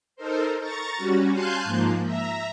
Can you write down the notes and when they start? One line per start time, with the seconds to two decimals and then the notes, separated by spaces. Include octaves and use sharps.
0.16 D#4 A4 A#4 C5
0.60 A#5 C#6 A6
0.97 G3 C#4 F#4
1.32 F5 G#5 A5 C6 F#6 G6
1.64 G#2 F3 A#3
2.03 E5 A#5